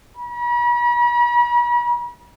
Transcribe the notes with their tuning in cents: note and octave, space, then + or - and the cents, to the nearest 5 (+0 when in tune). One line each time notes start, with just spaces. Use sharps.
B5 -45